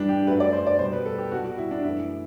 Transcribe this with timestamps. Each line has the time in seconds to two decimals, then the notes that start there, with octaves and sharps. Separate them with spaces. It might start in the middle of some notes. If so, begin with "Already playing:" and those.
Already playing: G2 E3 G3 D4
0.09 G4
0.27 F#2 F#3 A3 B4
0.40 D5
0.53 C5
0.67 D5
0.79 B2 G3 C5
0.92 B4
1.06 A4
1.18 G4
1.32 B2 G3 F#4
1.44 F#4
1.58 E4
1.71 D4
1.84 F#2 E3 A3 E4